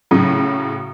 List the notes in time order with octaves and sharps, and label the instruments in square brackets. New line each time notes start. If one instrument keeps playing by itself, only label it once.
[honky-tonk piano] A2 C#3 F#3